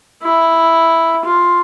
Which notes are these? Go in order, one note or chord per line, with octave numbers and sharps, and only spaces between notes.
E4
F4